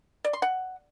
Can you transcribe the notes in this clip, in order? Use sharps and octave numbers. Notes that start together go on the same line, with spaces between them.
D5
C6
F#5